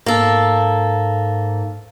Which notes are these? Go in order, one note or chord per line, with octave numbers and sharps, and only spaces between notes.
G#2 A#3 A4